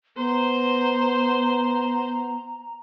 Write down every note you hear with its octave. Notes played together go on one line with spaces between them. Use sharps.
B3 C5 A#5